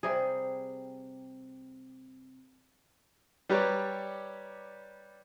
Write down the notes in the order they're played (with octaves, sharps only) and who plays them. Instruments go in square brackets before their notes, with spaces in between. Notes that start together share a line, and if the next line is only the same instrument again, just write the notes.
[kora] C3 G3 G#4
[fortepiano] G3 G4 B4 C#5 D5 A#5